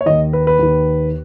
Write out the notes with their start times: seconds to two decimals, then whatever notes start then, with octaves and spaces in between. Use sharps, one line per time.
0.01 C#5
0.06 D#2 D#3 D#5
0.33 B4
0.47 B4
0.59 D#2 D#3